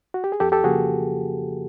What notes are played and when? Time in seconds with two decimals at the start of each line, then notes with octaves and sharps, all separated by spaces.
0.14 F#4
0.24 G4
0.32 G#4
0.40 F2 G4 A4
0.52 G4 A4
0.64 C#3 F3 A#3 F#4 G#4